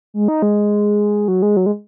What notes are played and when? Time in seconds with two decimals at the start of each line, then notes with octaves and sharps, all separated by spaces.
0.14 G#3
0.28 D#4
0.42 G#3
1.28 F#3
1.42 G#3
1.57 F#3
1.66 G#3